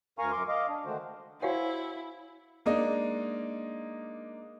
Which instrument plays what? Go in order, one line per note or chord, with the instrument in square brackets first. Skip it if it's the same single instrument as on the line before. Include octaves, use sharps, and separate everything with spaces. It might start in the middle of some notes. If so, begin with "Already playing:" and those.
[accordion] D2 A#4 F5 G#5 A#5 C#6
F#2 A#4 C6 D6
D#5 F5 D6
D4
D3 D#3 G#3 A3 F#4 C5
[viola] E4 [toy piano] F#4 F5 F#5 [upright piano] C5 C#5 G#5
[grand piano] G#3 A#3 D4 D#4